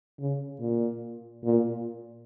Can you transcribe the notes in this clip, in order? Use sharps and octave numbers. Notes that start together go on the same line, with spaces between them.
C#3
A#2
A#2